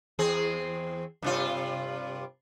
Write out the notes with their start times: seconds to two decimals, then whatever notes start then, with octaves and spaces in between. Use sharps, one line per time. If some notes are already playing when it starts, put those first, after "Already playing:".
0.19 E2 C4 G#4
1.22 G2 C3 F4